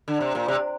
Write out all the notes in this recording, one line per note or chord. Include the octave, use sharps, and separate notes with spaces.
D3
C3
A#2
C3